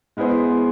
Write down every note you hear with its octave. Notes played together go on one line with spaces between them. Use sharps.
G#3 B3 E4 G#4 C5